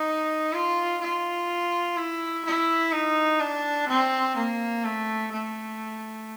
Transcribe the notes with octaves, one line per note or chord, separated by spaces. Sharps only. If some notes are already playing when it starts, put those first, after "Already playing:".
Already playing: D#4
F4
F4
E4
E4
D#4
D4
C4
A#3
A3
A3